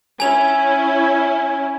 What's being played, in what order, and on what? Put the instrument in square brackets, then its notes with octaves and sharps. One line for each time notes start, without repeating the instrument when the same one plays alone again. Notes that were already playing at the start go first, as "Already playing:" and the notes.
[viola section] C#4 E4 [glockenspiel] G#5 F7